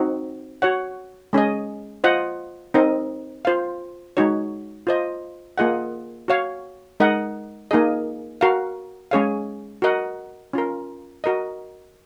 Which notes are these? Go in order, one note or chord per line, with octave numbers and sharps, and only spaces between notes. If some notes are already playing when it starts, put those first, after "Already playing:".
Already playing: C4 D#4 F#4
F#4 C#5 F#5
G#3 C#4 G#4 D#5
F4 C5 D#5 F#5
C4 D#4 A#4 D#5
F4 C5 F5
G#3 D#4 F#4 C#5
F4 C5 D#5
A#3 F4 G#4 D#5 F#5
F#4 C#5 F5
G#3 D#4 A#4 D#5 F#5
A#3 D#4 G#4 D#5
F#4 A#4 F5
G#3 C#4 G#4 C#5 F5
F#4 A#4 D#5 F#5
C#4 F4 A#4
F#4 A#4 D#5